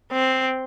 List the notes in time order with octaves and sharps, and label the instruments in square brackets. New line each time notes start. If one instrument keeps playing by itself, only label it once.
[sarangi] C4